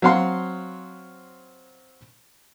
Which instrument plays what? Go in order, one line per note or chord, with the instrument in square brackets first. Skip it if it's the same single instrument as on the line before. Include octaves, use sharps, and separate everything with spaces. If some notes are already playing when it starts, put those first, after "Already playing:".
[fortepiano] F#3 C4 F5 F#5 C6